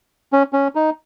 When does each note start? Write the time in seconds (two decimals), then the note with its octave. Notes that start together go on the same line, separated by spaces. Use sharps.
0.33 C#4
0.53 C#4
0.75 D#4